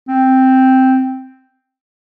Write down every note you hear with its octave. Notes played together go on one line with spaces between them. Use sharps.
C4